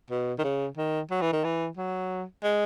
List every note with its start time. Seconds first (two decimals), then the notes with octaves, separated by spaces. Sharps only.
0.10 B2
0.38 D#3
0.44 C#3
0.77 D#3
1.11 F#3
1.22 E3
1.33 D#3
1.44 E3
1.77 F#3
2.44 G#3